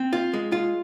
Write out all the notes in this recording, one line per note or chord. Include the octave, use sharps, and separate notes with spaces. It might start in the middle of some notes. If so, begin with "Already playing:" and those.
Already playing: C4
F4
G#3
F4